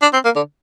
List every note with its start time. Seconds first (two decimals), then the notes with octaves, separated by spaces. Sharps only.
0.02 D4
0.13 C4
0.25 A#3
0.36 D3